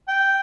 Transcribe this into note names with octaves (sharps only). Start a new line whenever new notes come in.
G5